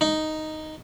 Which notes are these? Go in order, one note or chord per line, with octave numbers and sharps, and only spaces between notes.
D#4